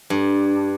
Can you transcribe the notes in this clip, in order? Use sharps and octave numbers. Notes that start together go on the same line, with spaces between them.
G2